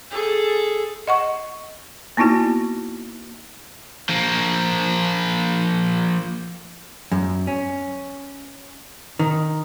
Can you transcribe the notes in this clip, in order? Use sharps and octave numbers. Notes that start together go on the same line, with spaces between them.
G#4 A4
D#5 F#5 C#6
A#3 B3 D#4 E4 F#4
F3 A#3
F#2
C#4
D#3